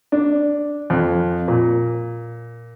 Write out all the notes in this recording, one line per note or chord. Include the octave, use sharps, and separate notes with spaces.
D4
F2
A#2